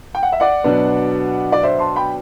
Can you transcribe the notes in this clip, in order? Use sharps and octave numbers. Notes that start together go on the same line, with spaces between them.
G5
F#5
E5
D5 F#5
B2 F#3 B3 D4
D5
C5 E5
A5 C6
G5 B5